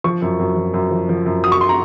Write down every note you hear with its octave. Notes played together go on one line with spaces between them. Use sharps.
F3 C#6
F#2
F#2
F3
F#2
F3
F3
F#2
F#3 D#6
C#6
C6
A#5